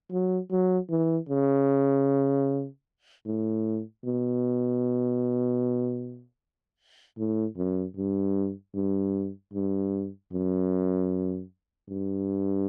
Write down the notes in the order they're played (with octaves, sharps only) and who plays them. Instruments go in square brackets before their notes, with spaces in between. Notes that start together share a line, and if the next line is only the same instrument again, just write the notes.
[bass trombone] F#3
F#3
E3
C#3
A2
B2
A2
F#2
G2
G2
G2
F#2
G2